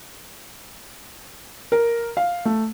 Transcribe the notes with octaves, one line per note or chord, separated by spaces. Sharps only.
A#4
F5
A3